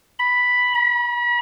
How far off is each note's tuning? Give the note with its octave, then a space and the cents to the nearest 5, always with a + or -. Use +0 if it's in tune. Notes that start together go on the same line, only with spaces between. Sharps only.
B5 +0
B5 -40